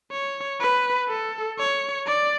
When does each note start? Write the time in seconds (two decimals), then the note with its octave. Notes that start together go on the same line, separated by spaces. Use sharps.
0.11 C#5
0.60 B4
1.09 A4
1.59 C#5
2.07 D5